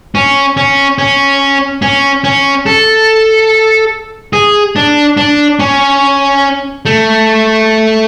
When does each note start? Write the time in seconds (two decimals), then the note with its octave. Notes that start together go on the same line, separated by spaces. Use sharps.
0.15 C#4
0.57 C#4
0.98 C#4
1.82 C#4
2.24 C#4
2.66 A4
4.33 G#4
4.76 D4
5.17 D4
5.60 C#4
6.86 A3